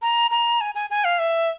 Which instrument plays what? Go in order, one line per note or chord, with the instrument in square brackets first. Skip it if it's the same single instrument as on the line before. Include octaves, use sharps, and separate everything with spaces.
[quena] A#5
A#5
G#5
G#5
G#5
F5
E5